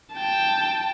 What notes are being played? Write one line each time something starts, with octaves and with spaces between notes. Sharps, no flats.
G5 A5